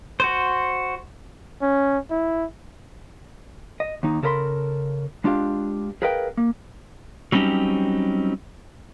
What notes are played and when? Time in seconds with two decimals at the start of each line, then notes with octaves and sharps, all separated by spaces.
0.20 F#4 C5
1.62 C#4
2.10 E4
3.80 D#5
4.03 D#2 D#4
4.22 C#3 A4 A#4 D5 B5 C6
5.24 G#3 D4 F4 G4 F5
6.02 G#4 A#4 B4 D#5 F5 G5
6.37 A#3
7.32 F#3 G3 C4 C#4 D#4 G4